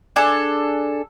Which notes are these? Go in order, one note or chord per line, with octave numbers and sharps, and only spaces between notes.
D4 G#4 A4